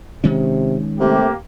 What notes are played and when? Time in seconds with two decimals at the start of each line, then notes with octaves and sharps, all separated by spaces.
0.24 C3 D#3 G#3 C#4
0.99 C3 A3 A#3 G4